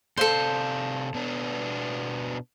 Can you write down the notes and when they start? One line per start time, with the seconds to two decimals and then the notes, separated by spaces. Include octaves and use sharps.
0.17 C3 A4 C5 D5 F5
1.14 B2 B3 D4